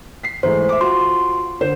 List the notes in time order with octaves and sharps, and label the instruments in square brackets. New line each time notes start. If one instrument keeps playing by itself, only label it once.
[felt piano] B6 C7
[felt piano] G#2 E3 A3 [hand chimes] C5
[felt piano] E5 D6
[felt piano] F4 F#4 [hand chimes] C6
[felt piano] D3 C5